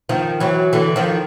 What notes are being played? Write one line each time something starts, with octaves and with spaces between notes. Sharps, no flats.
D#3 F3
E3 F#3
D3 E3
D#3 F3